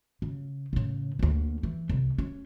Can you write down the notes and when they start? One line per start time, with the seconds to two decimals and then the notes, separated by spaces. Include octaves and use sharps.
0.22 C#3
0.73 A2 C#3
1.19 D2 A#3
1.63 E3
1.89 C2
2.18 C#4